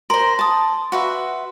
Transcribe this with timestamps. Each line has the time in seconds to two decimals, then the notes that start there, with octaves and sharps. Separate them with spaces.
0.10 A#4 C5 C6
0.39 A5 D#6
0.92 F#4 B4 E5